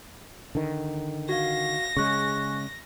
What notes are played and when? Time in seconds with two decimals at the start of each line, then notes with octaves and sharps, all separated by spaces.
0.55 D3 D#3
1.29 F#4 F5 A#6
1.97 C#3 G#3 C#6 F#6